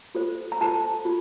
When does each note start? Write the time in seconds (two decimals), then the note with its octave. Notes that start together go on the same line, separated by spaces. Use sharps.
0.15 F4 A4 C5
0.52 A#5
0.61 F4 A4 C5 A5
1.05 F4